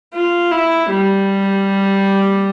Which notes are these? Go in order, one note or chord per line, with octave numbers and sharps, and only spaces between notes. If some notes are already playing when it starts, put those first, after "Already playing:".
F4
E4
G3